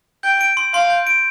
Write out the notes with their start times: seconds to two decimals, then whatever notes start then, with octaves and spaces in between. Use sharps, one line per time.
0.23 G5 G6
0.41 D7
0.57 C6
0.74 F5 C6
0.90 G6
1.07 D7